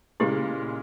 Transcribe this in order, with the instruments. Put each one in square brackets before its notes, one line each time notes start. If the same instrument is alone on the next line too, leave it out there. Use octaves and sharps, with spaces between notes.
[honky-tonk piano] A#2 C#3 G#3 [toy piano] E4 G4